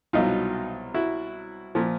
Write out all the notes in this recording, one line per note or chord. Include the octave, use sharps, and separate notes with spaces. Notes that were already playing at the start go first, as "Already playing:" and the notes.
C2 B2 F#3 D#4 F4
E4 F#4
A#2 F3